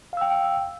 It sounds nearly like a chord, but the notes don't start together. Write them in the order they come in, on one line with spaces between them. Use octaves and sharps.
F5 E6 G5